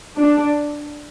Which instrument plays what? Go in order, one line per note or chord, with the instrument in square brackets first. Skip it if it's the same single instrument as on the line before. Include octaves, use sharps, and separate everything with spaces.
[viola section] D4